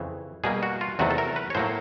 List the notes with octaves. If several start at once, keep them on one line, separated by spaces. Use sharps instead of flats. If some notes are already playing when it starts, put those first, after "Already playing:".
Already playing: F2 C#3 E3
B2 G3 A#3 G#4
F#4
F4
E2 C3 D#3 F#3 A3 F#4
A4
A#4
B4
C#5
A2 F#3 A#3 C5